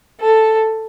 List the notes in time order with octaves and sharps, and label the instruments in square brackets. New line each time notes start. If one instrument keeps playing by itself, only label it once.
[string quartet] A4